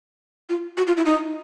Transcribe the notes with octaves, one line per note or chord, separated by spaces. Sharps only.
F4
F#4
F4
E4
D#4